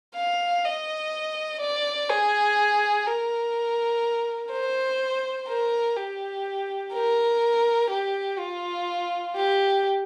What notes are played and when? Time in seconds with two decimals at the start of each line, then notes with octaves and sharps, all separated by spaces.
0.15 F5
0.64 D#5
1.61 D5
2.09 G#4
3.06 A#4
4.51 C5
5.48 A#4
5.97 G4
6.94 A#4
7.90 G4
8.39 F4
9.36 G4